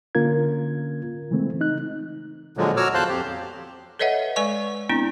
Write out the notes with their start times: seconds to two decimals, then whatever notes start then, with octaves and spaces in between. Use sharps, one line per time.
0.15 D3 A#3 C#4 F4 A#4 G#6
1.31 C#3 E3 G#3 A3 C4
1.61 D#4 F#6
2.57 A#2 D3 F3 F#3 G#3
2.77 F#4 C#5 A#5 D6 E6 F6
2.94 E2 C5 F5 A5 C6 F#6
3.09 F2 G4
3.99 A4 B4 C#5 D#5 E5 F#5
4.36 G#3 B4 D5 G#5 C#6
4.89 B3 C4 D4 E4